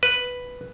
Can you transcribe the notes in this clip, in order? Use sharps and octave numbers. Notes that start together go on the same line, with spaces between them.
B4